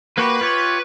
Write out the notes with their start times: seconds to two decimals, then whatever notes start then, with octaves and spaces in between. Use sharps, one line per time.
0.18 A#3 F#4 G4 B4 B5
0.41 F4 G4 C#5